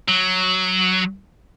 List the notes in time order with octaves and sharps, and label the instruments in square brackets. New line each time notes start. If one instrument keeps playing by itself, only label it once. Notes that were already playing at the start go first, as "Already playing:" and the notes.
[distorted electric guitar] F#3